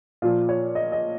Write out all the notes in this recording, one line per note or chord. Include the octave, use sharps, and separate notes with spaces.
A#2 F3 F4
C#5
D#5
D#5